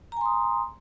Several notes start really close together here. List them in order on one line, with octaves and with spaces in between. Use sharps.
A#5 G#5 C6 D#6